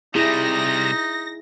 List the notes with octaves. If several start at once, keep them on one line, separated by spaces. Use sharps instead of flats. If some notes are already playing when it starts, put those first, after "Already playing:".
C3 G3 D#4 E4 G#4 A#6